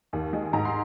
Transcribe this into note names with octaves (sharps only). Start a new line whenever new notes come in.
D#2
G#3
G#2 A#5
C6